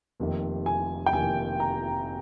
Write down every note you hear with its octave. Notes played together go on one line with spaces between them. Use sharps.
F1 F2 C3 D#3 A#3
G#5
G5
F1 F2 C3 D#3 A#3 G#5
A#5